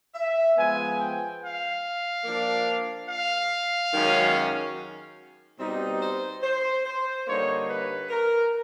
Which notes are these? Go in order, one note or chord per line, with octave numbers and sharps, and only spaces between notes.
E5
F3 G#3 B3 G#5
G5
F5
F3 A#3 D4
F5
F#2 D#3 G#3 C#4
B2 G3 C4 D#4
C5
C5
C5
D3 G3 A#3 D#4 C#5
B4
A#4